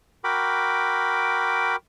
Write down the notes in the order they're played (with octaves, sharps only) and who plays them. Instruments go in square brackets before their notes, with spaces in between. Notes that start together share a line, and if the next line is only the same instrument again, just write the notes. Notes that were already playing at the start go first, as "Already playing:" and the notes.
[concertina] F#4 A#4 G5 B5 D6